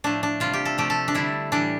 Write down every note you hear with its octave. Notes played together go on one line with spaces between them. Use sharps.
A2 F3 A3 D4
D4
C3 G3 F4
G4
A4
C3 F3 A3 G4
A4
D4
D3 G3 E4
A2 E3 G3 D4